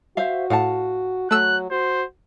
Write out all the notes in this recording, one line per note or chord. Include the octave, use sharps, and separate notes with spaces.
F#4 C5 E5 F5
A2 F5 F#5 A5
F#3 A3 E6 F#6
F#4 C5